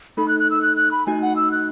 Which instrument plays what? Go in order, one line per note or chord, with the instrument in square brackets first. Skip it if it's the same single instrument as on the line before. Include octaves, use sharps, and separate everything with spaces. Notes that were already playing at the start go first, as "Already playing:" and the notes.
[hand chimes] A3 D#4 A4 [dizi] B5
[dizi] F#6
F#6
E6
F#6
F#6
B5
[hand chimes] A3 D#4 F#4 [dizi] G#5
[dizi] F#5
E6
F#6